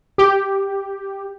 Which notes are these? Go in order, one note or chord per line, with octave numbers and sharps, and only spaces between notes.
G4